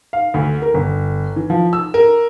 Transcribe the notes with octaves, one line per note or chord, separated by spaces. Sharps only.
F5
D2
A#4
G1
E3
F3
E6
A#4